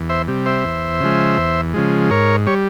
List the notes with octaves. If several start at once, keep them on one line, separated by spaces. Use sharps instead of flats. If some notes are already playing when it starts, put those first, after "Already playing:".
Already playing: E2
C5 E5
C3 G3
C5 E5
E2
C#3 F3 G#3
E2
C#3 F3 G#3
G#2 A#4 C#5
G3 C#5